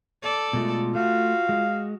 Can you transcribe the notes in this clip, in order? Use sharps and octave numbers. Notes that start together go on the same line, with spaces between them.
A4 D5
B2 G#3 A3 F4
A3 F#4 F5
G#3